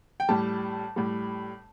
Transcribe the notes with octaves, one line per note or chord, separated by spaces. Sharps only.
G5
A2 G3 A5
A2 G3